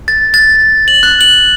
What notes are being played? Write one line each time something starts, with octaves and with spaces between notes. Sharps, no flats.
A6
A6
F#7
F#6
F#7